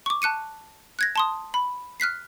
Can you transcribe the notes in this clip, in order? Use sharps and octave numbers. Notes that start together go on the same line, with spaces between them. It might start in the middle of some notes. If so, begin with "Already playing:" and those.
C#6 D6
A5 F#6 C#7 D#7
F#6 G#6 A#6
A5 C6 D#6
B5
F6 F#6 B6 C7